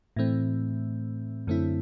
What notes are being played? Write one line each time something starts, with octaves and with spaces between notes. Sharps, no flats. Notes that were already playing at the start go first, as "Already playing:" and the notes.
A2 E3 A3 C4
F#2 D3 A3 C4 E4